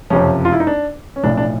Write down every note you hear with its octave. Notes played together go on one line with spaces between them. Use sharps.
F#1 F2 C3 F3 C#4
F4
E4
D#4
D4
C#4
B1 A2 F3 D4
D4